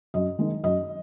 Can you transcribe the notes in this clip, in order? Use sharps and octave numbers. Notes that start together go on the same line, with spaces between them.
F#2 D#5
D#3 G#3
F#2 D#5